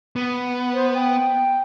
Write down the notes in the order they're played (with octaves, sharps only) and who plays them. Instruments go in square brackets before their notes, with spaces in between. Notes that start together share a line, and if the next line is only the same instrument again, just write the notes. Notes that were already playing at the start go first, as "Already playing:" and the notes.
[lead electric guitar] B3
[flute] C5
G5